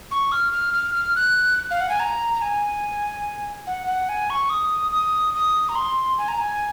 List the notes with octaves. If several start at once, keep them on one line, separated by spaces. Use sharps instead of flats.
C#6
F6
F6
F6
F6
F#6
F5
F#5
G#5
A#5
A#5
G#5
F#5
F#5
G#5
C#6
D#6
D#6
D#6
A#5
C6
G#5
A#5
G#5